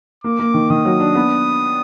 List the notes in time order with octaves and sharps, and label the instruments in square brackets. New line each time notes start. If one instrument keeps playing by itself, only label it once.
[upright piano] A#3 [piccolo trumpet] D6
[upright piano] A#3
D#3
[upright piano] D#3 [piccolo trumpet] D#6
[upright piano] F#3
D4
B3